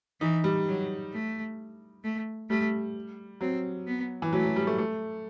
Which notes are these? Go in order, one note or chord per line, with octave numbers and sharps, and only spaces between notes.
E3 D#4
G3
F#3
A3
A3
G3 A3
F#3 C4
B3
E3
F#3 A3
F#3
G3
A3
A3